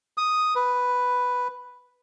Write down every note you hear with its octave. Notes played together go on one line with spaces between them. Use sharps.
D#6
B4